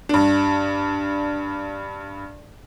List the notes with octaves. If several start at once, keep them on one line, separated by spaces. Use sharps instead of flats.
G2 D4